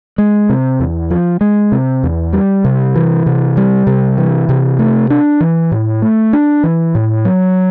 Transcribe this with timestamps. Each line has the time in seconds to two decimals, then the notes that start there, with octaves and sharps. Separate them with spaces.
0.18 G#3
0.49 C3
0.80 E2
1.11 F3
1.41 G#3
1.72 C3
2.03 E2
2.33 G3
2.65 C3
2.96 E3
3.26 C3
3.57 G3
3.87 C3
4.18 E3
4.49 C3
4.79 A3
5.10 D4
5.40 E3
5.72 A2
6.02 A3
6.33 D4
6.63 E3
6.95 A2
7.25 F#3